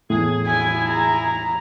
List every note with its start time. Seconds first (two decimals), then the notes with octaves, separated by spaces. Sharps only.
0.10 E2 A2 G#4
0.47 E4 G#4 G#5
0.90 A#5